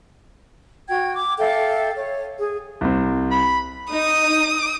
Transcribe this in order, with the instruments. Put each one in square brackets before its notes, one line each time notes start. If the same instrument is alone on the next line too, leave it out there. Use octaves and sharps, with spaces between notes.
[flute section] F#4 G5 G#6
D6
A4 E5 F5 G5
C#5
G#4
[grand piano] C2 C4
[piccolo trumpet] B5
[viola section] D#4 [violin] D#6